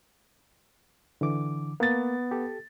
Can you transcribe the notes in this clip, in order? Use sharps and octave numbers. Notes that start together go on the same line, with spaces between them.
D3 E3 D6
A#3 B3 A6
G4 A4